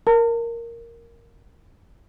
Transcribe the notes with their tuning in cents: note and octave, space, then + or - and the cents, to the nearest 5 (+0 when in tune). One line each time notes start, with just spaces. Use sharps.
A#4 +0 A5 +45